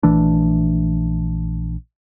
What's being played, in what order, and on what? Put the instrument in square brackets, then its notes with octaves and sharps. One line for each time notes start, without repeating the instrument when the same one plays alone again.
[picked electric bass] A#1 E3 A3 D4